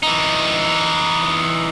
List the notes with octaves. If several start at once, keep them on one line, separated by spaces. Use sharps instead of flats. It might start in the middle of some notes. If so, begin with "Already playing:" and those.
E3 D#4